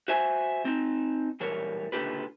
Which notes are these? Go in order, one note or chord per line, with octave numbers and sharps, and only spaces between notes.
F#4 C5 E5 G#5
C4 D#4
B1 A#2 E3 G3 A#4 C#5
C#2 A#2 D3 F4 G4 B4